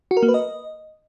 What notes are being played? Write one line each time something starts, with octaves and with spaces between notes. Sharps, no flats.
F#4
A#4
A#3
B4
D#5